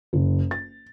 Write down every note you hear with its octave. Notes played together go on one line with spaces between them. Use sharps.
F#1
A6